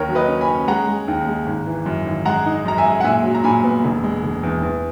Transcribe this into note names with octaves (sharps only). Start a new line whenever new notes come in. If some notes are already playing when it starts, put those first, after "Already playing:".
Already playing: D#2 A#4 C#5
F#3
B4 D#5
C#4
G#5 B5
C#4
G#3 F#5 A#5
G#3
D#2
G#3
G#1
E3
F#2
G#1
G#3 F#5 A#5
D#4
F#2 A#5
E5 G#5
G#3
F#5
A#2 E5 G#5
F#3
A#5
A#2 G#5 B5
B3
E1
G#3
E1
E2
E2